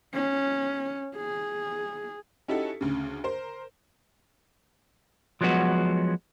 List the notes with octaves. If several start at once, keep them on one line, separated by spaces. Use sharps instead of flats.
C#4
G#4
C#4 D#4 E4 F#4 G4 A4
D2 C#3
A#4 C5
F3 F#3 G#3 B3 F#4